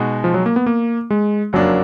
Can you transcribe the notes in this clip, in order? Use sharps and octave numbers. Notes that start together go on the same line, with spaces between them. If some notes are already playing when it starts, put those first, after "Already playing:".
Already playing: B2 G#3 D#4 F#4
F3
F#3
A#3
B3
A#3
G#3
F#1 F2 F3 F#3 A#3 D4